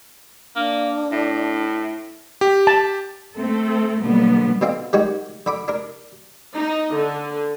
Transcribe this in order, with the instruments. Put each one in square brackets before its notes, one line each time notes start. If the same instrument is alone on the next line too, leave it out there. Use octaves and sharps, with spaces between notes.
[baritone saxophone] A#3 [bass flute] D4
[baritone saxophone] A2
[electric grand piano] G4
[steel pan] A5
[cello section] A3 C4 A4
B2 D3 F#3 G3 A#3 B3
[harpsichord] B2 D3 C4 F4
D#3 G3 G#3 C#4 F#4
D3 B5 D6
D4 A#4
[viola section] D#4
D3